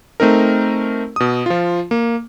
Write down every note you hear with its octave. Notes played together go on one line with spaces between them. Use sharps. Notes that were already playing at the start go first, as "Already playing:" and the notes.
A3 C4 D#4 A#4
B2 D#6
F3 F4
A#3